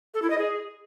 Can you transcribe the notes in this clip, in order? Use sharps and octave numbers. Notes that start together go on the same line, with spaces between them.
A4
E4
D#5
G#4